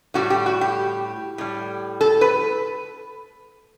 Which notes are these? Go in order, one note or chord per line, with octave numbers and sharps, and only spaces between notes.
A2 G3 F#4
G4
F#4
G4
A2 G3
A4
B4